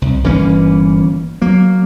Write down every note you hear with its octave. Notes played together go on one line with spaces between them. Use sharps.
C2
G1 E3 A#3 C#4
F#3 A#3